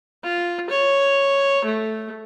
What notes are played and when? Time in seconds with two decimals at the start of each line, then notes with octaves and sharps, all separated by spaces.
0.24 F4
0.70 C#5
1.65 A3